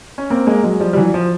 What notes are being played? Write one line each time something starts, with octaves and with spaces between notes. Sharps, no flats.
C#4
A#3 C4
G#3 A#3
F#3 G#3
F3 G3
G3
E3 F#3
F3